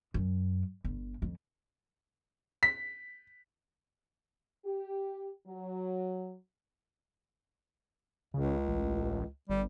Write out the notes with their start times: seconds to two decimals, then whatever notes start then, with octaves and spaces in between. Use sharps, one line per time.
0.14 F#2
0.84 G1
1.22 F2
2.63 B6
4.65 G4
5.47 F#3
8.34 C#2 C#3
8.67 A1
9.49 G1 G3